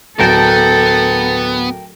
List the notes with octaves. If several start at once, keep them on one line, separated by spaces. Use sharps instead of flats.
D1 B3 A4 A#4 G5 A5